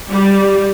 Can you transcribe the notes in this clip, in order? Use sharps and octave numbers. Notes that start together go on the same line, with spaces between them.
G3